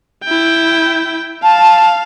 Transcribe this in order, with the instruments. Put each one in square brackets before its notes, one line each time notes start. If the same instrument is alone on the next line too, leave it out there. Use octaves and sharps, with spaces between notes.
[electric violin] E4 G5
[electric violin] F5 [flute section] A5